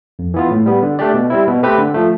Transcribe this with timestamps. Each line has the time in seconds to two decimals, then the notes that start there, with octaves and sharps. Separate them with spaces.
0.19 F2
0.34 E3 B3 F4
0.51 A2
0.66 G3 B3
0.82 D3
0.99 A3 D4 G4 D5
1.14 B2
1.30 G3 C4 E4
1.47 B2
1.63 A3 C4 G4 B4
1.79 D3
1.94 F3 A3